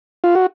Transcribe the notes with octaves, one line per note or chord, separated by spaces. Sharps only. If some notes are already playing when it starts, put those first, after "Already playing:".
F4
F#4